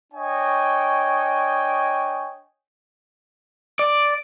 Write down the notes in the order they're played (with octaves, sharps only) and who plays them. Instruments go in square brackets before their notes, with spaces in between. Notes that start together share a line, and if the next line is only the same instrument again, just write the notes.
[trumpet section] D4 C#5 D#5 G5 G#5
[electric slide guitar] D5